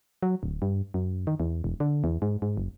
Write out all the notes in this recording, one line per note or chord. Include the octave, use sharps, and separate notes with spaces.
F#3
D1
G2
F#2
D#3
E2
E1
D3
E2
G#2
G#2
F#1